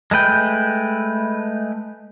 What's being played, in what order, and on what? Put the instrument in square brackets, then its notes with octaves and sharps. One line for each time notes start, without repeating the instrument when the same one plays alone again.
[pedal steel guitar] G#3 A3 B4 G5